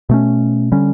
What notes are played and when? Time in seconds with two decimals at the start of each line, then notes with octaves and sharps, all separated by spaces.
0.09 B2 A3 C#4
0.72 D3 G3 C#4